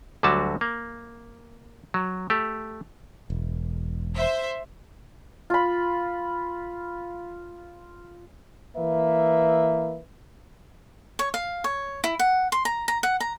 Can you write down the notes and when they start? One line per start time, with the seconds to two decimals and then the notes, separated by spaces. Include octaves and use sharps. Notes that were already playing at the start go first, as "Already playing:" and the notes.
0.23 D2 D3 F#3 G3 F#4 A5
0.61 A#3
1.94 F#3
2.30 A3 G4
3.30 E1
4.13 C5 E5
5.50 F4 B5
8.77 E3 A#3 B4 E5
11.19 C#5
11.34 F5
11.64 C#5
12.04 E4
12.19 F#5
12.52 C6
12.65 A#5
12.88 A#5
13.03 F#5
13.20 A#5